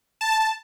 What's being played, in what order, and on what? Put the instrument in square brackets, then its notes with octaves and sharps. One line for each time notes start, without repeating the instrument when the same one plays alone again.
[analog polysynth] A5